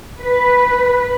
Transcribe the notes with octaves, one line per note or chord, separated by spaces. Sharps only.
B4